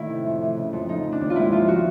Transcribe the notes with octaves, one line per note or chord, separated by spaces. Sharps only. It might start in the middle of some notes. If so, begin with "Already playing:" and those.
Already playing: A2 D#3 E4
C3
F2
E3
C#3
F2
F3 D#4
C#3
D4
D#2
F4
G#2 E4
F3 F4
F#4